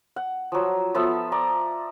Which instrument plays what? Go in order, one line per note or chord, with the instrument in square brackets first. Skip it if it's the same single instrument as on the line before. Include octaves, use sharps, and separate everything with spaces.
[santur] F#5
F3 F#3
F3 B3 A4 E5
D5 A#5